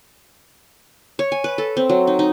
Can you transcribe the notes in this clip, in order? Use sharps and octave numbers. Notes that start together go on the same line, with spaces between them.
C#5
G#5
B4
A4
C4
F#3
D#4
D#4